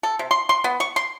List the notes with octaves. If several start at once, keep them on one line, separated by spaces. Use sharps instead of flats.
A4
C3
C6
C6
B3
C#6
C6